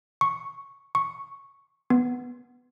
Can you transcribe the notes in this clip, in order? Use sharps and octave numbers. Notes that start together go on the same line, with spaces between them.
C#6
C#6
B3